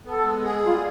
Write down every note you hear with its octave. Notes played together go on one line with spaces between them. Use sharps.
B3 A4
G#3
G#4
G3 F4